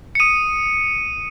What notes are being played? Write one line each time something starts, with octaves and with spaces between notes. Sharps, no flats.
C#7
D#6 D#7